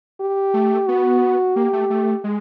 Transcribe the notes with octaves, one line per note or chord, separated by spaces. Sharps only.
G4
A3
B3 F#4
A#3 G4
A3
A3
G#3